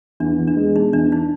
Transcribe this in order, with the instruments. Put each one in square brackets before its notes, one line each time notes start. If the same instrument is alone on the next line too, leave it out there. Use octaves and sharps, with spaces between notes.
[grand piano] E2 [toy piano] D4
[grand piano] E2
[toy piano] D4
[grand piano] G#3
[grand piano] B2 [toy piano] D#4
[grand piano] E2 [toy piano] D4
[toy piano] D#4